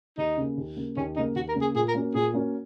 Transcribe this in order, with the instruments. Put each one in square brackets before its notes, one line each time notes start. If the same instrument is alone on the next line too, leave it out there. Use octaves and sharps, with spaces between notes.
[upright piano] D#2 [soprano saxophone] D#4
[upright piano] C#3 A#3
D#2
C#3 A#3
[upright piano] D#2 [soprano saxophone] C#4
[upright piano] C#3 A#3 [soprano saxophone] D#4
[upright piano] D#2 [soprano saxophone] F#4
[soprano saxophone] A#4
[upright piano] C#3 A#3
[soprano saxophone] G#4
[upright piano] A#2 [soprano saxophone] G#4
[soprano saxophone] A#4
[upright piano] A#3 C#4 F#4
[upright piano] A#2 [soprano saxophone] G#4
[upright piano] A#3 C#4 F#4